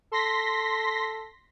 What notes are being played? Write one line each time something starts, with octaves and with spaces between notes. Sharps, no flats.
A4 C6 A#6 B6